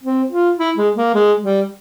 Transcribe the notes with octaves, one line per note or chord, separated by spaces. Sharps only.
C4
F4
E4
G#3
A#3
G#3
G3